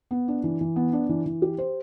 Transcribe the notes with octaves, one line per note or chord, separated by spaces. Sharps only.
B3
D4
E3
E3
B3
D4
E3
E3
G4
C5